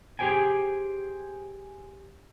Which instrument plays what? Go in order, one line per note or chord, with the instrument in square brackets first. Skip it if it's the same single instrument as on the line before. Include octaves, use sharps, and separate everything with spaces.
[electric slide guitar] G4 G#4 C5 G5 G#5